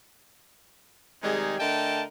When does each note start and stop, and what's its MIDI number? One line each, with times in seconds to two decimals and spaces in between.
1.23 1.55 48
1.23 1.55 51
1.23 1.55 55
1.23 1.55 56
1.23 1.55 63
1.23 1.55 68
1.59 2.04 50
1.59 2.04 57
1.59 2.04 70
1.59 2.04 75
1.59 2.04 79
1.59 2.04 81